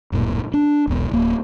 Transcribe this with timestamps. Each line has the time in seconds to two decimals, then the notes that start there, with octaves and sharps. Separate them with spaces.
0.12 D1 F#2 A#2
0.54 D4
0.87 E1 B1 B2
1.11 D1 A#3